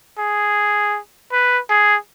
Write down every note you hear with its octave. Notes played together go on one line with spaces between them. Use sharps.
G#4
B4
G#4